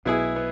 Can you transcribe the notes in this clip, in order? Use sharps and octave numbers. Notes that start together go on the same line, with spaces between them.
B1 B2 B3 E4 G#4
B3